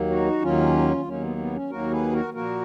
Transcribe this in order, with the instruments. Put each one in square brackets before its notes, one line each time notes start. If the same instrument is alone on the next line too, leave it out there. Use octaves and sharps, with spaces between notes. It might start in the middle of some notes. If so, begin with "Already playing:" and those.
Already playing: [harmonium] D#2 D#3 F#3 A#3
D#4 F#4
D#2 D#3 F#3 A#3 C#4 F4
D#2 D#3 F#3 A#3 C#4
B3
B3
C#4
D#2 D#3 F#3 A#3 F#4 A#4
G#4 B4
F#4 A#4
A#2 F3 A#3 F#4 A#4